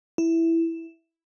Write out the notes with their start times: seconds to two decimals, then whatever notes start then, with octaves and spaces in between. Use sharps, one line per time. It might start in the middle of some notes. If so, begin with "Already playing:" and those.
0.18 E4